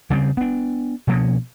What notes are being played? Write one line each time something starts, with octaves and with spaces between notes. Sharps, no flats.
C#3 G3 B3 C4
B3 D4
B2 F3 A#3 C#4